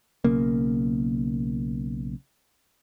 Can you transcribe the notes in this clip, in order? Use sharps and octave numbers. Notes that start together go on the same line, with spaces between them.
B1 C#3 A#3